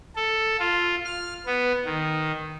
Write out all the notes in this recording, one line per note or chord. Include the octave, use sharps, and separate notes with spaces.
A4
F4
F6
B3
D#3